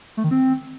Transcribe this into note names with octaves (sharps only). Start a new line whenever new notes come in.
A3
D#3
C4